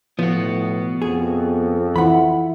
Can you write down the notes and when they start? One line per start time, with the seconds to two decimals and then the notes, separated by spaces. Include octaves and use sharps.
0.19 A2 F3 B3 F#4
1.02 F2 G#4
1.96 E3 E4 F#5 B5